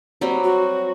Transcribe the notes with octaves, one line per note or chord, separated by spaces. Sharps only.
F#3 G3 C4
F#4